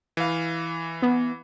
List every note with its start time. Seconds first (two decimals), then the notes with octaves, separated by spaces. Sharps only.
0.17 E3 F5
1.02 B3